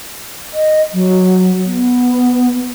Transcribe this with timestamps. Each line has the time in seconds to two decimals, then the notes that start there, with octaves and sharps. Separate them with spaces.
0.53 D#5
0.93 F#3
1.65 B3